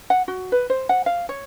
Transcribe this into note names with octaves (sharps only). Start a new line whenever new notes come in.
F#5
F#4
B4
C5
F#5
F5
C#5